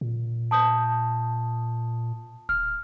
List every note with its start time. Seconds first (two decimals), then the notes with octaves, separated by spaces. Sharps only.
0.01 A#2
0.51 A5 D#6 G6
2.49 D1 F6